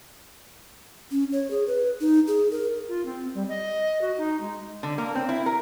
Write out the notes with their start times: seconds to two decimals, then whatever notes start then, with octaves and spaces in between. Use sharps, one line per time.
1.11 C#4
1.32 C#5
1.51 G#4
1.67 B4
2.01 D#4
2.27 G#4
2.51 A#4
2.88 F4
3.05 C4
3.34 G3
3.49 D#5
4.01 F#4
4.18 D#4
4.40 G#3
4.83 D3
4.98 A#3
5.15 C4
5.29 E4
5.46 A#4